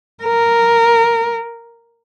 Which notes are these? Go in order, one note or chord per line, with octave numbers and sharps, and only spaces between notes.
A#4